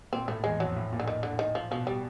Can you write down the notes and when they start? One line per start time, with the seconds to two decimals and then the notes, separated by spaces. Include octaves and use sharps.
0.13 A#2 C4
0.28 A2 A3
0.44 E2 G#3
0.60 F2 F#3
0.76 A2
0.92 A#2
1.00 D3
1.08 D#3
1.23 D3
1.39 D#3
1.55 F3
1.71 B2 F3
1.87 G3